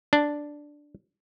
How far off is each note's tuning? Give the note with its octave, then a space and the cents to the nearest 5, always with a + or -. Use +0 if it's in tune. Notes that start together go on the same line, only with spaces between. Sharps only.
D4 +0